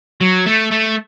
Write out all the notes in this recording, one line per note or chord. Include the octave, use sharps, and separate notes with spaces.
F#3
A3
A3